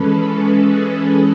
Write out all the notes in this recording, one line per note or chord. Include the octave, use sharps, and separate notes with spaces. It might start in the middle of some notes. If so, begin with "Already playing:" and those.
Already playing: E3 G#3 C#4 A4 B4
A4
G#4